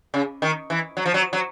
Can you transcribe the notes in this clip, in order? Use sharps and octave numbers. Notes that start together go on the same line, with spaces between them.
C#3
D#3
E3
F#3
F3
F#3
F#3